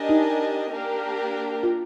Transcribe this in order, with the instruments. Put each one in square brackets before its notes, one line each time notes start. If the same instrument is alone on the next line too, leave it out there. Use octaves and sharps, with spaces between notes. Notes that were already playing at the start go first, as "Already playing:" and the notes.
Already playing: [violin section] D4 G4 A#4 D#5 G#5
[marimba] D#4
[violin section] A#3 D4 G4 A#4
[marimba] F4